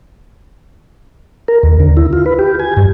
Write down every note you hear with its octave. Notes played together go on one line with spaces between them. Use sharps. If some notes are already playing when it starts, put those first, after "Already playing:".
A#4
D#2
D3
E4
F4
B4
G4
G#5
G2